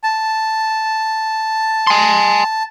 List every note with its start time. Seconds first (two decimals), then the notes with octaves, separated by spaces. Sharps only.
0.04 A5
1.87 G#5 C6